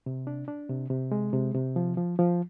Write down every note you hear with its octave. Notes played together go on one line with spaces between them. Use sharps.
C3
D4
D4
C3
C3
G#3
C3
C3
F3
F3
F3